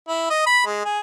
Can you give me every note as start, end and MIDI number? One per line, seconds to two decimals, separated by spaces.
0.09 0.28 64
0.30 0.43 75
0.47 0.65 83
0.66 0.85 56
0.85 1.00 68